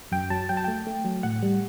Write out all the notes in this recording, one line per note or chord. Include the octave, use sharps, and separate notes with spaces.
F#2 G5
F#3 A5
F#3 G5
A5
A3 G5
A3
F#3
A2 F#5
G3